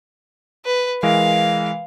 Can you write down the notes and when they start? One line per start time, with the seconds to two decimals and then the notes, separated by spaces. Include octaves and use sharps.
0.65 B4
1.03 E3 G#3 A#4 F5